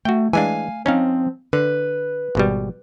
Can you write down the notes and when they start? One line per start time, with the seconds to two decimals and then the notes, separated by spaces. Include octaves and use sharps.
0.05 A3 F#4 G5
0.33 E3 G#3 D4 F5 G#5
0.86 F3 C4 C#4 D#4 F5
1.53 D3 B4
2.35 G#1 B2 G3